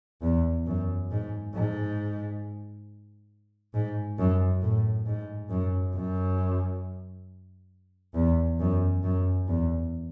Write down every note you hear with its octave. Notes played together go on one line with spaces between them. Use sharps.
E2
F#2
G#2
G#2
G#2
F#2
A2
G#2
F#2
F#2
E2
F#2
F#2
E2